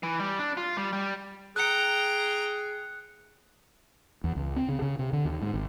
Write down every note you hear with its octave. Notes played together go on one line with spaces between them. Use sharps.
E3
G3
D4
F4
G3
G3
G#4 G5 A#5 F#6 C#7
E2
C#2
C4
C#3
C#3
C3
D3
D#2
G#2
G#1